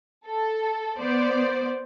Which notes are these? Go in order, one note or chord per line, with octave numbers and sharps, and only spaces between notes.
A4
B3 C5 D5